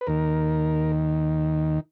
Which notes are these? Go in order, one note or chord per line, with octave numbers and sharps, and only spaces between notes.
B4
D#2 D#3 A#4